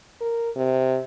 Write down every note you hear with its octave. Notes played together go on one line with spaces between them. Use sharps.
A#4
C3